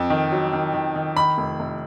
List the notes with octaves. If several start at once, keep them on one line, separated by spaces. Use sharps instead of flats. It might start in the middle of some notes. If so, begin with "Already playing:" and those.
Already playing: F2
D#3
F#3
D#3
D#3
D#3
D#3 B5
F1
F1